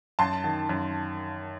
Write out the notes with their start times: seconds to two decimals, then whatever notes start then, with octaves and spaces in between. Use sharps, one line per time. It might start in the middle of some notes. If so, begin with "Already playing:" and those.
0.19 F#2 A5 C6
0.44 D#3
0.69 F#2